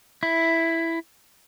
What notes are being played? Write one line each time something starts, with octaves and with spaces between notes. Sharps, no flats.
E4